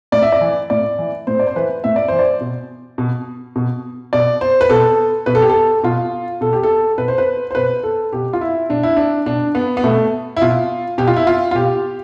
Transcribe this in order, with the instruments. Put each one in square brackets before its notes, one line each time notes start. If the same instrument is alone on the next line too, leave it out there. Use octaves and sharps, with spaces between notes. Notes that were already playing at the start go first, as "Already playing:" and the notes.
[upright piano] A2 D5
E5
D5
E3
A2 D5
E3
A2 C5
D5
C5
E3 B4
A2 E5
D5
E3 C5
D5
B2
B2
B2
B2 D5
C5
B4
B2 A4
B2 B4
A4
G4
A4
B2 F4
B2 A4
G4
A4
B2 B4
C5
B4
C5
B2 B4
A4
B2 G4
F4
E4
B2 D4
E4
D4
B2 D4
B3
B3
B2 A3
E4
B2 F4
B2 G4
F4
E4
F4
F4
B2 G4